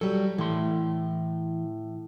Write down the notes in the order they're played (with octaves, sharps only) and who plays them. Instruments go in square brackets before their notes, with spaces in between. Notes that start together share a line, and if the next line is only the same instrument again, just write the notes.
[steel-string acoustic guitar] F#3 G3 [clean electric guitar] A4
[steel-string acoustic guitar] A2 [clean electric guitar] E3 C6